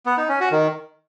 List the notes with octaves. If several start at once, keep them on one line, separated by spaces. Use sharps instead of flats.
B3
D#4
C#4
F#4
D#3